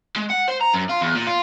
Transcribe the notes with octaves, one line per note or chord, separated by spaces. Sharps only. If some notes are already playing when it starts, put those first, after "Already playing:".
G#3
F#5
C5
A#5
F#2
F4
E2
A#2
F4